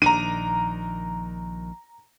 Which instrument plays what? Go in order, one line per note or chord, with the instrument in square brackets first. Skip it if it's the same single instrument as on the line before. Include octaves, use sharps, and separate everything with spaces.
[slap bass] A#1 D#3 D4 [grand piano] A#5 D#7